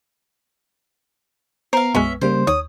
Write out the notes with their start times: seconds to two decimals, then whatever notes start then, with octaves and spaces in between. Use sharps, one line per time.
1.73 B3 A#4 C5 F5
1.95 B1 F#2 G#3 C#4 E5
2.22 C#3 G3 A#3 C5
2.47 D#2 C#5 D#6